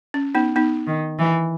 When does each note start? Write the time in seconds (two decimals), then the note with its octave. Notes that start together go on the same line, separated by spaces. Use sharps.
0.14 C#4
0.35 B3 D#4
0.56 B3 D#4
0.87 D#3
1.19 E3